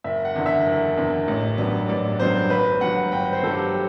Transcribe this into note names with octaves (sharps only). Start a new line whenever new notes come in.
F#1 E5
F#5
E2 D3
E5
F#1
E2 D3
A1
G2 F#3 B3 D4
A1 D5
G2 F#3 B3 D4 C5
G1 B4
G2 F#3 F#5
G1 G5
C5
G2 F#3 A4
G4